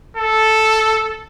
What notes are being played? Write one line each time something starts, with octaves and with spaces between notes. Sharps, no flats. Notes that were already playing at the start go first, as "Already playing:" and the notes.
A4